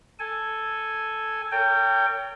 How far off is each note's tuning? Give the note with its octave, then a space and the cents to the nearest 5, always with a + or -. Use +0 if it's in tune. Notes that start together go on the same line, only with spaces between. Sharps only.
A4 +0 G#5 +0
A#4 -40 C#5 +25 G5 +0